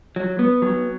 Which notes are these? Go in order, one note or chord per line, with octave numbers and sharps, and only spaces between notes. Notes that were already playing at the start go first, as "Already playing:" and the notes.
F#3
B3
F#3